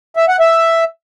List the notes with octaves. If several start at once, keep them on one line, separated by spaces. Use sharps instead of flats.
E5
F#5
E5